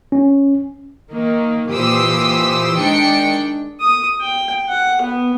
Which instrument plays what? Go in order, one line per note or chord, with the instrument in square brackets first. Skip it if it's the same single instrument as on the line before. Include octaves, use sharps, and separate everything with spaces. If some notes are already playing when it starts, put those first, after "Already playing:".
[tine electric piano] C#4
[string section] D#3 A#3
A#2 E3 G4 C5 D#6 E6
D#3 G#3 D4 G5 C#7
[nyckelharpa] D#6
G5
F#5
B3